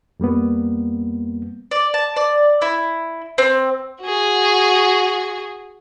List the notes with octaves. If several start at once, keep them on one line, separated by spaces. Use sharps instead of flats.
F2 G3 A#3 B3
D5
A5
D5
E4
C4
F#4 G#4